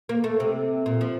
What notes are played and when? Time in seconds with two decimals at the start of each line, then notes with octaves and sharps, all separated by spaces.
0.09 A#3
0.24 A3
0.40 C3
0.86 A#2
1.01 F3